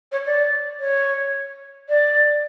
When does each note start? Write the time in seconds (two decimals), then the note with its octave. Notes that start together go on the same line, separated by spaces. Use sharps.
0.11 C#5
0.26 D5
0.79 C#5
1.88 D5